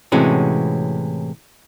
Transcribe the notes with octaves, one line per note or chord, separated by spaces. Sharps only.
A2 C3 E3 G#3 C#4 F#4